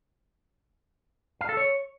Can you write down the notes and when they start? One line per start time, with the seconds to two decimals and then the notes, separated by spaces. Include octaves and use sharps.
1.41 F5
1.49 A4
1.57 C#5